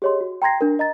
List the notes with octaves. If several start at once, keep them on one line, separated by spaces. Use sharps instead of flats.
G4 G#4 C#5 D#5 C6
F#4
G5 A#5 C6 G#6 A#6 C7
D4 A#4
D#5 A#5 A6